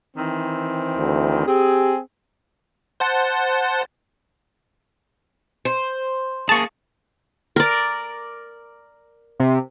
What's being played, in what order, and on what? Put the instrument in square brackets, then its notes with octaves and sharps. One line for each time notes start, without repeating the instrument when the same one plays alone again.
[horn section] D#3 E3 C4
[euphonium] D2
[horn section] C4 G#4 [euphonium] G4
[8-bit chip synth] C5 F#5 A5
[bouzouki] C5
[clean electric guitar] A#3 G#4 [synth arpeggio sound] A5 C#6
[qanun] A#4 D5
[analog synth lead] C3